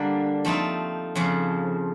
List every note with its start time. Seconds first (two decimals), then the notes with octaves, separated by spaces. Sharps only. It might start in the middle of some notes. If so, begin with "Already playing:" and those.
Already playing: D3 G3 A#3 D4
0.45 F3 A3 C4 D#4
1.15 F2 C#3 F3